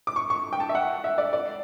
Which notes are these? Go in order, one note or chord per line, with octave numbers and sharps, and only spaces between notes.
D6
C#6
C#6
G5
A5
E5
F#5
E5
D5
D5